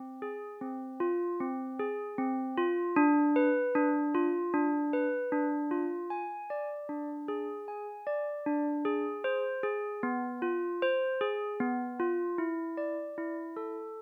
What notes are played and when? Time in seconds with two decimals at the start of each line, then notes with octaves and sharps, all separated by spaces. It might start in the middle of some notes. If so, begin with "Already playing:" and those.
Already playing: C4
0.22 G#4
0.61 C4
1.00 F4
1.40 C4
1.79 G#4
2.18 C4
2.57 F4
2.96 D4
3.36 B4
3.75 D4
4.15 F4
4.54 D4
4.93 B4
5.32 D4
5.71 F4
6.10 G#5
6.50 D5
6.89 D4
7.28 G#4
7.68 G#5
8.07 D5
8.46 D4
8.85 G#4
9.24 C5
9.63 G#4
10.03 B3
10.42 F4
10.82 C5
11.21 G#4
11.60 B3
12.00 F4
12.38 E4
12.77 D5
13.18 E4
13.57 A4